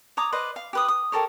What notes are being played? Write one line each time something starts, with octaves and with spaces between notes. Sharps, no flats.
C#5 A#5 D6 D#6
B4 C5 D5 D#5
F5
G4 B4 D#6
D#6
G4 A4 A#4 C#5